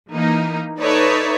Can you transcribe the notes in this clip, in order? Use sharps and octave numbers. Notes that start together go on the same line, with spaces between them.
E3 A#3 D#4
D#4 A4 B4 C#5 D5 E5